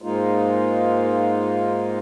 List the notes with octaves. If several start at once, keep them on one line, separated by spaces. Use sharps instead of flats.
G#2 G#3 A#3 D#4 F4